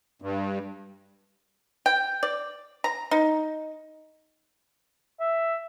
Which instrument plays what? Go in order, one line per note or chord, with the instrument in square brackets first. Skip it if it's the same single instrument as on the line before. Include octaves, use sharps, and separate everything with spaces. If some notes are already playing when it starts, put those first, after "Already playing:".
[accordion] G2
[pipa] G5
D5
A#5
D#4
[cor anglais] E5